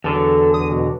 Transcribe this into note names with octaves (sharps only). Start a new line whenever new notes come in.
E2 D3 F#3 A4
D#6
B2